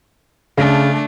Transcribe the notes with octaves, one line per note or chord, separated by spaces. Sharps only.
C#3 A3 D4